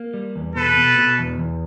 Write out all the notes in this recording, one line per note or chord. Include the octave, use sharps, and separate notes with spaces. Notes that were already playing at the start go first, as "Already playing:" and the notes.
Already playing: A#3
G3
E2
B2 A4 B4
B2
B2
E2
E2